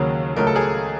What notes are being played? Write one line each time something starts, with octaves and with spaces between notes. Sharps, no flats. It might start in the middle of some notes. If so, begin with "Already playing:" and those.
Already playing: D#2 C#3 F#3 A#3
C#2 C#3 F#3 A3 A#4
A4
G#4 A#4